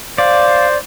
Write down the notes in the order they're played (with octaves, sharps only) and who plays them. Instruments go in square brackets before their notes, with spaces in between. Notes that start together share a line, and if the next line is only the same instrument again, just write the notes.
[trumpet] C5 [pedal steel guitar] D5 [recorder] F5